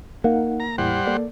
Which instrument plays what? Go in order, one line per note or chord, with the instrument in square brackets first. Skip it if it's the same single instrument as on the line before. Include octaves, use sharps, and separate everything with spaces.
[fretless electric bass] A#3 [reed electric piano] D#4 F5 F#5
[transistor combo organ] A#5
[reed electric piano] E2 A2 E4 [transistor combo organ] G3 C5 F#5
[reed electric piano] A#3 A4 D5